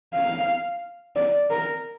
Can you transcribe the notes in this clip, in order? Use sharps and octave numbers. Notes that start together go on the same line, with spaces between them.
F5
D5
A#4